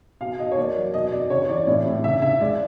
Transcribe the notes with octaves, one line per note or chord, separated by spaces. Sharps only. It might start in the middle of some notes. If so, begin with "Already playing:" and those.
B2 F5
B2 D#5
C#5
A#3 D5
F#3
B2 D#5
B2 D5
C#3 C#5
C#5
E3 D5
A2 D5
A2
C#3 E5
C#3 E5
G#3 D5